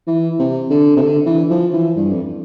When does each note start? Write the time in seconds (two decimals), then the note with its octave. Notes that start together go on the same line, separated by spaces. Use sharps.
0.07 E3
0.39 C3
0.70 D3
0.96 C3
1.02 D3
1.26 E3
1.50 F3
1.74 E3
1.96 G2
2.12 F2